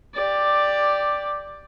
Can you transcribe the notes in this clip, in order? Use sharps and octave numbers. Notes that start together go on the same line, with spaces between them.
G4 D5